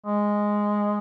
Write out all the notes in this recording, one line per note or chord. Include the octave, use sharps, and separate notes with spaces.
G#3